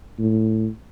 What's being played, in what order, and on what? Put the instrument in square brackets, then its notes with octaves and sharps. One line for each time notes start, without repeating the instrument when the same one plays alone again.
[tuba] A2